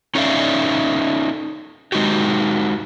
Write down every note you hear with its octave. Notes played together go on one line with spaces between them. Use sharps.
C#4 D#4 A4 D5 E5 F5
G#3 D#4 F#4 G4